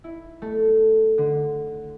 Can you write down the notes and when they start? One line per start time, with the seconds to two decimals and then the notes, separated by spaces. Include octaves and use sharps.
0.04 E4
0.42 A3
1.18 D3